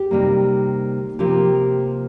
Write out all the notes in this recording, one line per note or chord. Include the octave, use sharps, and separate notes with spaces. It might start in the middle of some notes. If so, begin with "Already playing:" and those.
Already playing: G4
C3 D#3 G3 A#3
C3 F3 A#3 G4